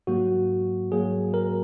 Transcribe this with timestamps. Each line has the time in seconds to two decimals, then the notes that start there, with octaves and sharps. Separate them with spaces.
0.07 G#2 F#3 A#3 F#4
0.91 G#2 F#3 A#3 G#4
1.34 A#4